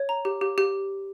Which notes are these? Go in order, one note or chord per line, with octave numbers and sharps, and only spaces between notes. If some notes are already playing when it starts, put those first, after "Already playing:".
Already playing: C#5
A#5
G4
G4
G4